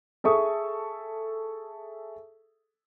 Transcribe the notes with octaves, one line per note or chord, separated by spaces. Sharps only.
G#4 A4 E5 C#6 D#6